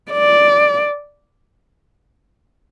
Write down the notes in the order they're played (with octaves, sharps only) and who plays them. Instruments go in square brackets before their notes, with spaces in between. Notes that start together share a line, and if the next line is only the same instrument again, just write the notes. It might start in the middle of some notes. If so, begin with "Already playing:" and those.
[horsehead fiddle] D5